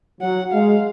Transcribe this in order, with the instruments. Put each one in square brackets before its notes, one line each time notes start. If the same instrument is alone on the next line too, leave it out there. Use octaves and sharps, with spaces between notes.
[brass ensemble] F#3 [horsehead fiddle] F#5
[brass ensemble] G#3 [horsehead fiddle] F5